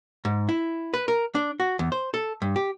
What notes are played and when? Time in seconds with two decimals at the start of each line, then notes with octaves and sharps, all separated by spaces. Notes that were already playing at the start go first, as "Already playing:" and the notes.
0.25 G#2
0.49 E4
0.94 B4
1.08 A#4
1.35 D4
1.60 F#4
1.79 E2
1.92 C5
2.14 A4
2.42 G2
2.56 G4